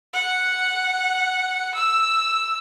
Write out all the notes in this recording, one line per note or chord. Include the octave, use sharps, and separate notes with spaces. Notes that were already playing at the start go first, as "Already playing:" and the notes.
F#5
E6